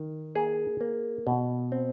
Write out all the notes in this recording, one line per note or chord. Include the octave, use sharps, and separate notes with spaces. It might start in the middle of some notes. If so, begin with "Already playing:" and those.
Already playing: D#3
A#3 G#4
A#3
B2
C4